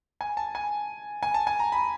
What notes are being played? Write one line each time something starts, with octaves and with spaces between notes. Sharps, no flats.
G#5
A5
G#5
G#5
A5
G#5
A#5
B5